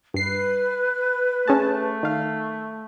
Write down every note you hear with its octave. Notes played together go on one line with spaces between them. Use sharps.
G2 B4 C7
A3 C#4 G#4 A5
D#3 F5